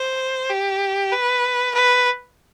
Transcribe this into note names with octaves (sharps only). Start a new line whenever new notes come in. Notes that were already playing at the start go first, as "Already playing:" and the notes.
Already playing: C5
G4
B4
B4